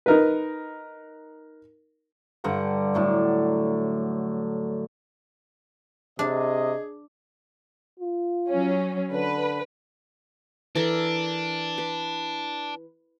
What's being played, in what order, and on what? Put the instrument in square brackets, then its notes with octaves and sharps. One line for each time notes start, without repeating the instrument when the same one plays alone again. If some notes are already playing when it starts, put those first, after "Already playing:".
[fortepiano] D#4 A#4 B4
[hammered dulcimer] G2 D3 F#5 A#5
A2 F#3 D4
[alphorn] C3 [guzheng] D4 [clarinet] G#4 [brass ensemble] D#5
[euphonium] F4
[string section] F#3 C#4
[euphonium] D3 [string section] B4
[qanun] E3 A4 A#4 [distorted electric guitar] D4
[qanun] B4